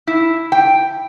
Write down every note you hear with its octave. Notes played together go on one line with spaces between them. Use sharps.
E4
G5